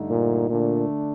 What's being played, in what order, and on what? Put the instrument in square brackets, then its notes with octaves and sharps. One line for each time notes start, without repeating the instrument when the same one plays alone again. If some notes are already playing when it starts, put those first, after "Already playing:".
Already playing: [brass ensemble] G2 D3 A3 D#4
[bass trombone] A#2
[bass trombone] A#2 [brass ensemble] D3 A3 D4